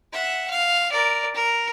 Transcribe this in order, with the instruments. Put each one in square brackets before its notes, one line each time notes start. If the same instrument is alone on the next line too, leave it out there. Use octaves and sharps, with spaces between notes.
[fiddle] E5 F#5
F5
A#4 D5
A#4